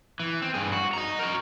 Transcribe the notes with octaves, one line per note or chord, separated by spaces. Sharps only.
E3
C4
G2 G#4
F#4
D#5 A#5
F#4 A#4